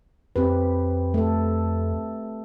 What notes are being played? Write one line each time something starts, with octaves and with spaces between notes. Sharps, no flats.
F2 C4 G4 B4
A3 A4